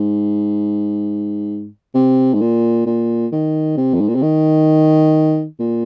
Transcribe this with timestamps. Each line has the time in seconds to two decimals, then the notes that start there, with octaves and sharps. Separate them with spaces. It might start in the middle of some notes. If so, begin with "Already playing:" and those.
Already playing: G#2
1.94 C3
2.34 G#2
2.41 A#2
2.86 A#2
3.32 D#3
3.77 C3
3.94 F2
4.00 G#2
4.08 A#2
4.15 C3
4.22 D#3
5.59 A#2